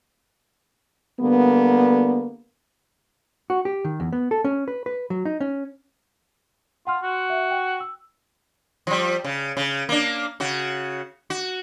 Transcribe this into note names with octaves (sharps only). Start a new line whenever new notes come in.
D3 G3 A#3 B3
F#4
G4
D#3
E2
B3
A4
C#4
B4
B4
F#3
D#4
C#4
F4 F#5 C6 F6
F#4
E5
G5
E6
F3 G3
C#3
C#3
A#3 D4
C#3 F#4
F#4